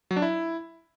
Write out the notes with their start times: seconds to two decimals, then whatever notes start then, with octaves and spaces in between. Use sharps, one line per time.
0.11 F#3
0.16 D4
0.22 E4